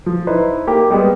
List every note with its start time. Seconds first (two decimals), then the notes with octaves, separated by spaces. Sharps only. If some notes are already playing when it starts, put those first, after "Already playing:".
0.06 F3
0.27 D#4 E4 B4 C5
0.67 A#3 G4
0.90 G3 G#3 B3